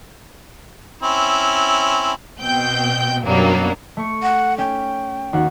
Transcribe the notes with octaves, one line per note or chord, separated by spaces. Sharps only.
C4 C#4 E4
B2 C4 G5 G6
F#2 B2 F#3 G3 A#3 D4
A3 C#6 C#7
F#5
C#4 G5
D#2 F#4 F#5